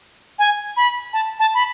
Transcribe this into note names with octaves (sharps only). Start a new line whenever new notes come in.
G#5
B5
A5
A5
B5